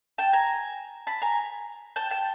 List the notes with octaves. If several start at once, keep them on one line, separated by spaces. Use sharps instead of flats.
G5 A5
G#5 A#5
A5 B5
G#5 A#5
G5 A5
G5 A5